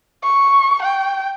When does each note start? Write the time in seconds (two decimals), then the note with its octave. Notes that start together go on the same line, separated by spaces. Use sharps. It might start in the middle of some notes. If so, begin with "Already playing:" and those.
0.24 C#6
0.83 G5